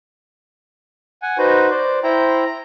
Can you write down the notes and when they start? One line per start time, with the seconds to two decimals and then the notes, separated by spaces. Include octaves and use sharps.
1.22 F#5 G#5
1.38 D#4 F#4 B4 C5
1.71 C5 D5
2.03 E4 C5 G5 A#5
2.46 A#5